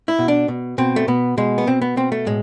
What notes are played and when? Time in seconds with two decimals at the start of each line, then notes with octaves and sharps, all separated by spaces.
0.08 E4
0.19 B2
0.28 D4
0.48 B2
0.78 B2 C4
0.96 A3
1.08 B2 B3
1.37 B2 G#3
1.58 B3
1.67 B2 C4
1.82 B3
1.97 B2 C4
2.12 A3
2.26 A2 G#3